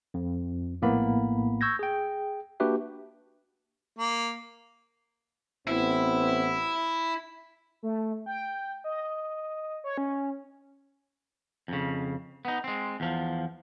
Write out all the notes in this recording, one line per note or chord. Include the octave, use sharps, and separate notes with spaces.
F2
A#1 A2 A#3 B3 B5
C#6 E6 G6 G#6 A#6
G#4 G5
A#3 D4 F#4 G4 B4 E5
A#3
A1 B3 C4 E4
A3
G5
D#5
C#5
C#4
F2 C#3
B3 D#4
G#3 C4
E2 F3